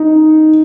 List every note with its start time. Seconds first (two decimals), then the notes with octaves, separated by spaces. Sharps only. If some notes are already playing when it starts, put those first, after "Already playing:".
Already playing: D#4